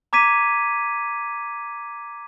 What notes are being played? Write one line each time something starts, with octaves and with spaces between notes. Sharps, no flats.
A#5 D6 G#6 B6 D#7